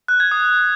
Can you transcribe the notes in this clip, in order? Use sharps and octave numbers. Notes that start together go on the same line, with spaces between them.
F#6
G#6
D#6